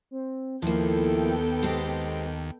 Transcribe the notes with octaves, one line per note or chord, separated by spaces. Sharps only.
C4
D#2 F3 A#3 B3 E4 A4 G5
G#3 C4 G4 D#5